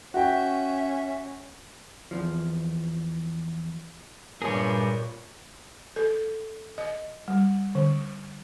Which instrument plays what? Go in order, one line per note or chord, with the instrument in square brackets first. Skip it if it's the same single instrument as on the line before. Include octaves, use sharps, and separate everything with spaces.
[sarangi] C#4 [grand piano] F#4 G5 [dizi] E5
[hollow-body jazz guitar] E2 F3
[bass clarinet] G2 [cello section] A#2 [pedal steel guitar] G3 G#4 [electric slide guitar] A#4 C#5
[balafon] A4
D#5
G3
D3